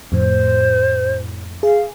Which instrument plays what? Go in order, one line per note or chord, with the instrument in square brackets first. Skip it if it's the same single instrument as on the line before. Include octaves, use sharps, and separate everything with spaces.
[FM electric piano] F2 A2 [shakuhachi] C5
[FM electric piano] G#4 [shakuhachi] F5